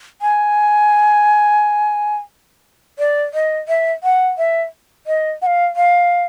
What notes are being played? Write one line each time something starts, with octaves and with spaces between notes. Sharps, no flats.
G#5
D5
D#5
E5
F#5
E5
D#5
F#5
F5
F5